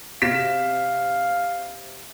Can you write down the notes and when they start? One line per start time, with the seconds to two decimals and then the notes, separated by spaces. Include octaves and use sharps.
0.22 C3 F5 B6 E7